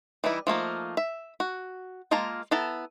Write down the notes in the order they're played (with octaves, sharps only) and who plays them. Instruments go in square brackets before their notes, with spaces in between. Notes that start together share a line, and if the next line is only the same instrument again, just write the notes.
[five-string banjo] E3 G3 D#4 E4
F3 A3 A#3 D#4
E5
F#4
G#3 A#3 F4 A5 A#5
B3 E4 A4 A5 A#5